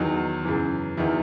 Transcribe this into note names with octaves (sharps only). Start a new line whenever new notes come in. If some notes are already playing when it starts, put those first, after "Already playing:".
Already playing: E2 D#3 F#3 D#4
F#2 C#3 E3
E2 D#3 F#3 E4